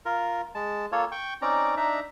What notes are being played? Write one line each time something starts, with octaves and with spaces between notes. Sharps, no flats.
F4 A#4
G#3 A5
A#3 F4 A4 C#5
G5 C#6
C4 C#4 D#4 D5 A#5
D4 D#4 E5 A#5